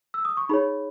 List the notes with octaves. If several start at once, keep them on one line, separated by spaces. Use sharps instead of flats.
E6
D#6
C#6
D#4 G#4 C#5 B5